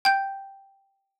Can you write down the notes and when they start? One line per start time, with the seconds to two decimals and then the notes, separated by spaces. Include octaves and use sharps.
0.05 G5 G6